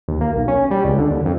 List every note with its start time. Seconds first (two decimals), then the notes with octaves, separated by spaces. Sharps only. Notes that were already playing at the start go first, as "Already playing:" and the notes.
0.08 D#2
0.21 A#3
0.34 B1
0.48 C#4
0.71 G3
0.84 C#2
0.98 D3
1.10 D#2
1.25 F2